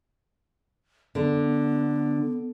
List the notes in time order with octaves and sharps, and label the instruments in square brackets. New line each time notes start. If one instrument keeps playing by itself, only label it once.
[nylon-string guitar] D3 [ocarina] B3